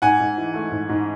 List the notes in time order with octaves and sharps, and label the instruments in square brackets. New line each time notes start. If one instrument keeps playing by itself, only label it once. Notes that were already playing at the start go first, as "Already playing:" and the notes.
[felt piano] G#2 [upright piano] F#5 G#5
[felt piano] G#2
E3
A3
G#2
G#2